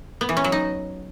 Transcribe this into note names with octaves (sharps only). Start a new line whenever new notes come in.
B3
E3
C#4
F#3
D#4